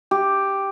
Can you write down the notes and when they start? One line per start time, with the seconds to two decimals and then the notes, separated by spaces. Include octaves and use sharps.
0.11 G4